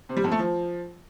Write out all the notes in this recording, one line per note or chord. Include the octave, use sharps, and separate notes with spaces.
C3
G3
F2
A3
F3